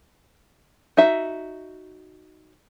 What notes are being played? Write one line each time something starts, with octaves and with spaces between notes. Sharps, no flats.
D#4 F#4 E5